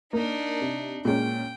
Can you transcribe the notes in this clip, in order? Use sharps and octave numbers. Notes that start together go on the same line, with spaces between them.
A#3 D4 D#4
C3
A#2 G#3 C#4 G5